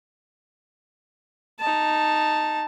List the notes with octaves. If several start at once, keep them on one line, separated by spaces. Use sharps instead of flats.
D#4 A5